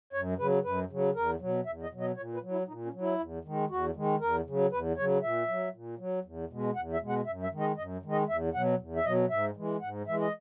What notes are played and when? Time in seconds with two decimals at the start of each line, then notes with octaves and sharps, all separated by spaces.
0.13 F#2 C#5
0.38 C#3 F#3 B4
0.64 F#2 B4
0.90 C#3 F#3
1.15 E2 A#4
1.40 B2 F#3
1.65 E2 E5
1.83 D#5
1.91 B2 F#3
2.01 D#5
2.16 A#2 C#5
2.34 B4
2.43 F#3
2.52 E4
2.68 A#2 D#4
2.85 C#4
2.94 F#3
3.01 E4
3.18 E2
3.45 D#3 G#3
3.70 E2 F#4
3.95 D#3 G#3
4.21 E2 A#4
4.46 C#3 F#3
4.72 E2 B4
4.97 C#3 F#3 C#5
5.23 A#2 E5
5.48 F#3
5.74 A#2
5.99 F#3
6.24 E2
6.50 B2 G#3
6.76 E2 F#5
6.93 E5
7.01 B2 G#3
7.09 F#5
7.26 F#2 E5
7.43 E5
7.52 D#3 G#3
7.60 D#5
7.77 F#2 D#5
8.03 D#3 G#3
8.12 D#5
8.29 E2 E5
8.54 B2 F#3 F#5
8.79 E2
8.96 E5
9.05 B2 F#3 D#5
9.30 G#2 E5
9.57 E3 G#3
9.81 G#2 F#5
10.06 E3 G#3 E5
10.21 D#5